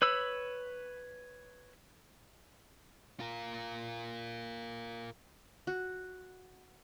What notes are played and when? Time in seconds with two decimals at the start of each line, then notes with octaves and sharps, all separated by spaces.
0.02 B4 C#5 B5 E6
3.20 F4 A#4
5.67 F#4